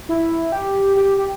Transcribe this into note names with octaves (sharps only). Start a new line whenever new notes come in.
E4
G4
G4
G4